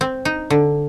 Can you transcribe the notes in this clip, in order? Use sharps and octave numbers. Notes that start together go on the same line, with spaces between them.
C4
D#4
D3